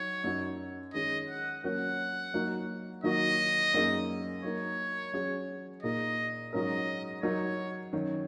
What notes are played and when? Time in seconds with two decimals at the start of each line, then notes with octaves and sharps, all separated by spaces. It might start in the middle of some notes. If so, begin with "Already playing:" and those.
Already playing: F#3 D#4 C#5
0.24 F#2 F#3 D#4 F#4
0.94 D#3 G#3 C#4 D#5
1.29 F#5
1.64 F#3 A#3 C#4 F#4 A#4 F#5
2.34 F#3 A#3 D#4 F#4 A#4
3.03 D#3 F#3 A#3 F#4 D#5
3.74 F#2 F#3 A#3 D#4 G#4
4.43 F#3 A#3 D#4 A#4 C#5
5.14 F#3 C#4 G#4
5.83 A#2 A#3 D#4 G#4 D#5
6.53 G#2 F#3 C#4 A#4 D#5
7.23 F#3 D#4 A#4 C#5
7.93 D#3 F#3 C#4 F#4